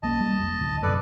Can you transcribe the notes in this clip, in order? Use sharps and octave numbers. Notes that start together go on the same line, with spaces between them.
B1 A#3 C#4 D#5 A5
G3 A#3
F1
A1 D2
F#2 C3 A4 B4 D5